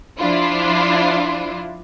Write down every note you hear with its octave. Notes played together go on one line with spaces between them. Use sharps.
F3 D4 E4 F4